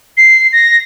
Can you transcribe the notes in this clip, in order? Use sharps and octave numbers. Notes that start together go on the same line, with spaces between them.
C7
A#6